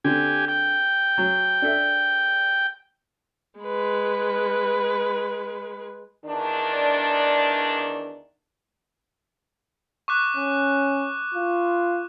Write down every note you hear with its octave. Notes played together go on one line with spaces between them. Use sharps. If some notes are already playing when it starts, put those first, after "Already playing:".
D3 C4 G4 G#5
G5
F#3
D4 A4 E5
G#3 B4
E2 D#3 D4
C#6 D6 F#6
C#4
F4